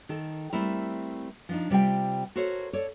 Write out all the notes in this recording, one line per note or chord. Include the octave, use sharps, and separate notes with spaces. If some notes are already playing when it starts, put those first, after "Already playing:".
D#3 A4
G3 A3 C4 E4 A#4
F3 D4 D#4
C3 G3 F4 G5
F#4 A4 A#4 C5 C#5 E5
A4 C#5 D5